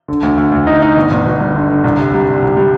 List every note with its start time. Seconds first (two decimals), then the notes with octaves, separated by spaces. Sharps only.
0.08 D3
0.23 D2
0.38 D2
0.52 D2
0.67 D#4
0.82 D#4
0.97 G1
1.11 G1
1.26 G1
1.40 G2
1.55 D3
1.69 D3
1.84 C2
1.99 C3
2.14 G3
2.27 C3
2.42 C2
2.57 G3